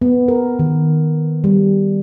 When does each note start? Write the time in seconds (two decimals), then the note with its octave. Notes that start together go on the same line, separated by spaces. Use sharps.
0.02 B3
0.28 A#4
0.59 D#3
1.44 G3